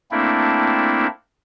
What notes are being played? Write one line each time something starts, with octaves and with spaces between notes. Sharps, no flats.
A3 A#3 C4 D4 E4